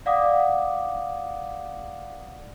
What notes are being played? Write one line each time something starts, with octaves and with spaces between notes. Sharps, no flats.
D5 F5 F#5 D6 D#6